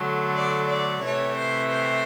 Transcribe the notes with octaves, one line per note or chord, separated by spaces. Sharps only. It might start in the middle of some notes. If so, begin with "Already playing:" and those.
Already playing: D3 F#3 A3
D5
D5
C3 E3 A3 C#5
C5
C5